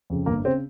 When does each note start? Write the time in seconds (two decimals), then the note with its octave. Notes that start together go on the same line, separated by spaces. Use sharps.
0.10 F2 C#3
0.26 G1 A#3
0.45 C#3 C4